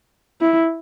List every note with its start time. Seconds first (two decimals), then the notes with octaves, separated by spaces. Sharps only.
0.41 E4